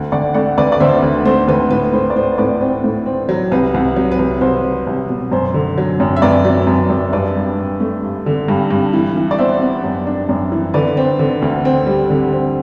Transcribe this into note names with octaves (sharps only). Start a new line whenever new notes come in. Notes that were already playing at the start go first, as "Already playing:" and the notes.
Already playing: D2
D2 D5 F#5
A3 D5 F#5
D2 B4 D5
D5
D2 C5 E5
D2
A3 C5
D2 B4
A2 B4
A2 C5
D5
A2 C5
A2 B4 D5
C4 B4
A2
C4
F#3
C2 B4
C2
F#3
B4
C2
C2 C5
F#3
C2
B2
F#2 C5
D3
F#3
F#2
E5
F#2 B4 D5
F#3
F#2
F#2
G2 B4 D5
G2
G2
A3
G2
D3
G2
G2
E3
E3
D5
B3 C5 E5
B3
F#2
D4
F#2
E3
D3 B4 D5
C4
D3
D2
C4
G3
D3
C4